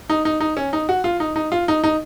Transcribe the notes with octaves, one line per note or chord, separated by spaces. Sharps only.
D#4
D#4
D#4
C#4
D#4
F#4
F4
D#4
D#4
F4
D#4
D#4